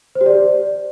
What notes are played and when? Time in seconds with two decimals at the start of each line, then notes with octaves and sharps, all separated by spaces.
0.15 C5
0.21 G4
0.26 D5